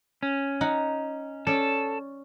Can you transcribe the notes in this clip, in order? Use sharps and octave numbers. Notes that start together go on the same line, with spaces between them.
C#4
D#4 F#5
C#4 A4 C#5 D5